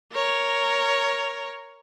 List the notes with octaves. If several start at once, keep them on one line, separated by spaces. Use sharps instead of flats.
A#4 C#5